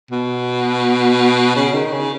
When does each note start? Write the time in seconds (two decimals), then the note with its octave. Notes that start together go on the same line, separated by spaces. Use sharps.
0.11 B2
1.56 C#3
1.74 D#3
1.92 C#3